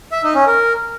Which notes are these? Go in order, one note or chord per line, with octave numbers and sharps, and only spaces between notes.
E5
D#4
C#4
A#4